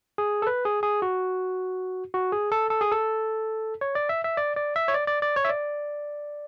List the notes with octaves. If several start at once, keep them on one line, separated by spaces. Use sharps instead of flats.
G#4
A4
B4
G#4
G#4
F#4
F#4
G#4
A4
A4
G#4
A4
C#5
D5
E5
E5
D5
D5
E5
C#5
D5
D5
D5
C#5
E5
D5